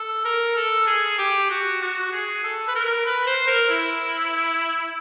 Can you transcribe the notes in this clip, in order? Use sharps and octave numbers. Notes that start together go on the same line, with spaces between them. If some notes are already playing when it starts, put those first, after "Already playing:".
Already playing: A4
A#4
A4
G#4
G4
F#4
F#4
G#4
A4
B4
A#4
B4
C5
A#4
E4